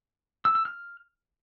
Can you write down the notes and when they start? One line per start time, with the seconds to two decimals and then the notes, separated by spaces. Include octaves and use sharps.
0.45 E6
0.55 E6
0.65 F6